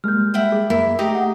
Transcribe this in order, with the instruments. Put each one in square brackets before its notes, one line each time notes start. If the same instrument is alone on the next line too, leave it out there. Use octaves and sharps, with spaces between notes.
[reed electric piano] G3 G#3 A#3 [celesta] F6 G6
[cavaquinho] E4 F#5 G5
[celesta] G#4
[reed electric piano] F#2 A#3 [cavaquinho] E4
[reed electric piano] A3 G5 [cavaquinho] D#4 G4 A#5
[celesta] F#5